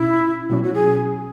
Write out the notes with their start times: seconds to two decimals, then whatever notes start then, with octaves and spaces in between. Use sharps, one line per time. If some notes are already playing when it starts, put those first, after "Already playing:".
Already playing: B2 C#4 E4
0.49 B2 F#3 C#4 F#4
0.63 F#4
0.74 G#4